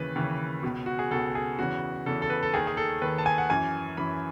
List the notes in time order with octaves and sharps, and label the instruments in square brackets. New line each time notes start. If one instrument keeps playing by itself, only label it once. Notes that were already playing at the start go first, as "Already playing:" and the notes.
Already playing: [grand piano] D#2 C#3 E3 B4
D#2 C#3 E3
C#2 B2
F#4
G#4
C#2 B2 A4
G#4
E2 C#3 E3 F#4
E2 C#3 E3 A4
A4
B4
A4
D#2 D#3 G#4
G#4
A4
D#2 D#3 B4
A5
G#5
F#5
F#2 E3 G#5
F#2 E3 B5